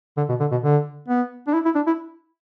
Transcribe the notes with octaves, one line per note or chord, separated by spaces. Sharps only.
D3
B2
D3
B2
D3
B3
D4
E4
E4
D4
E4